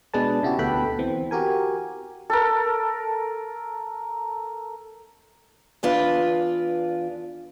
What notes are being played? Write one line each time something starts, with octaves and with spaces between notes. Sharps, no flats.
B2 G#3 D4 G#4 B4 A5
C#3 E4 F#4 G4
D2 B2 A4 B4 G5 B5
E3 C4
F#4 G4 A#4 G#5
A4 A#4
E2 D4 F4 B4